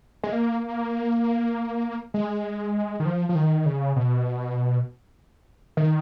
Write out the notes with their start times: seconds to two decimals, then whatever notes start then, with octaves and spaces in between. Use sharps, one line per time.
0.24 G#3
0.32 A#3
2.14 G#3
3.00 D#3
3.05 F3
3.29 F3
3.35 D#3
3.66 C#3
3.96 B2
5.77 D#3